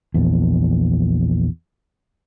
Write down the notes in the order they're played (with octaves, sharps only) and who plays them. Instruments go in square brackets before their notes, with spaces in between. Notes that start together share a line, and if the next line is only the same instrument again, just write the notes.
[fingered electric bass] A#1 E2